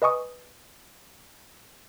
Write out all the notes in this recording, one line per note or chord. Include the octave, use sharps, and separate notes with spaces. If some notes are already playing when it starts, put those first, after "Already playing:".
B4 D#5 G#5 C#6 D#6